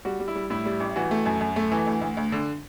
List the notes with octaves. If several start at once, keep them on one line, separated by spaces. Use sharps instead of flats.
G3 F#4
G3
E4
G3
A2 E4
G3
A1
E3 F#4
A3
F#2
F#2
A3
E3
D2
D2
D2
D3